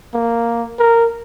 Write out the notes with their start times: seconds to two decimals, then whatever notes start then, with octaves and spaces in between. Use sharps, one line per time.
0.14 A#3
0.79 A#4